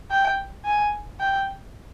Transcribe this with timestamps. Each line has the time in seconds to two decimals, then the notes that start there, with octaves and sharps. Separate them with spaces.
0.11 G5
0.65 G#5
1.20 G5